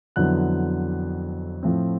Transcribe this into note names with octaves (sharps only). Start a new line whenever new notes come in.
F2 D3 F#3 B3 E4 F#6
A2 F3 A3 C4